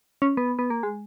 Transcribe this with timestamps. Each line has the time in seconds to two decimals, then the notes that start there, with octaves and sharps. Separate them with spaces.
0.22 C#4
0.37 B3
0.59 B3
0.70 A#3
0.83 G#3